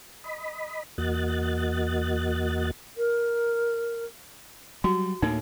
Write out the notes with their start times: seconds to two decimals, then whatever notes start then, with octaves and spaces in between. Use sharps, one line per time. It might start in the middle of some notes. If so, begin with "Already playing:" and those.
0.24 D#5 B5
0.98 E2 A#3 F#4 D#5 F#6 A6
2.97 A#4
4.84 F#3 G3 F#4
5.22 D2 A2 A#3 D#4